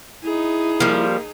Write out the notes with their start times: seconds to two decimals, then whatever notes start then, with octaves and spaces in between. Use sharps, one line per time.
0.23 D#4 E4 G#4
0.80 F3 G3 A#3